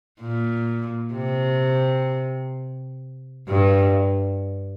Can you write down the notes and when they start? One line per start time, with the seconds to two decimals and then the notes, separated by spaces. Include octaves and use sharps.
0.20 A#2
1.14 C3
3.48 G2